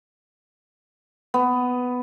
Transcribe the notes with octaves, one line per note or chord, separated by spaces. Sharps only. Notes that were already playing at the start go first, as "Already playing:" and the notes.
B3